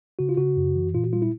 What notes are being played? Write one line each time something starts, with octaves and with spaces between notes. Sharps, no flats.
C#3 F#4
F4
C#3 F#4
F#2
E3
A#2 F4
F#4
G3 F4
E4